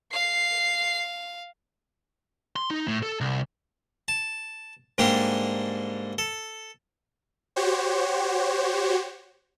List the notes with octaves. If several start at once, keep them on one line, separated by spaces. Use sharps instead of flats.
F5 C7
C6
D#4
A2
A4
C2
A5
G#2 D3 G3 A#3 D4 G4
A4
F#4 G4 C5 C#5